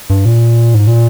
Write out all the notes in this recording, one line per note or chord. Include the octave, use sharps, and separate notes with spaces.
G2
A#2
G#2
A#2